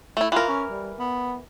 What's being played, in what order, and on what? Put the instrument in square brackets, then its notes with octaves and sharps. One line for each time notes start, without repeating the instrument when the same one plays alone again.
[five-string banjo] A3 E4
[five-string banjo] E3 A#4 [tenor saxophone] F4
[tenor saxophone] C#4
G3
B3